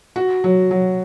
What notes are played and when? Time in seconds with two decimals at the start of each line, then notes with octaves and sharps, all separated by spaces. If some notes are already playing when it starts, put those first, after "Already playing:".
0.16 F#4
0.44 F#3
0.71 F#3